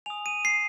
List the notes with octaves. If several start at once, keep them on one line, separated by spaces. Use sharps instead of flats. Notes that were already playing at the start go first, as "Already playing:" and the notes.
G#5 D#6 F7
D#7
C7